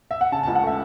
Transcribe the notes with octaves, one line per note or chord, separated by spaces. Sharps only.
E5
F#5
C#3 A5
C#2 A5
F#5
A3 E5